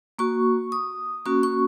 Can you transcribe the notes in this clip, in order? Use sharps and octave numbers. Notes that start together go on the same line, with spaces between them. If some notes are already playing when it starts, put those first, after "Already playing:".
A#3 F#4 C#6
D#6
A#3 C#4 F#4 C#6
C#6